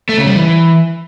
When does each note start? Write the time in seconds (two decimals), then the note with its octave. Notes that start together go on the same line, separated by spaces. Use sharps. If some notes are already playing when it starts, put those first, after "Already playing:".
0.09 A3
0.18 C#3
0.27 G3
0.35 E3